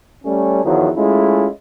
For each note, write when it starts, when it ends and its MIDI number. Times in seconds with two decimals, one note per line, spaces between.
0.24 0.64 55
0.24 0.64 57
0.24 0.64 61
0.64 0.90 40
0.64 0.90 51
0.64 0.90 53
0.64 0.90 54
0.96 1.47 56
0.96 1.47 57
0.96 1.47 61
0.96 1.47 64
0.96 1.47 65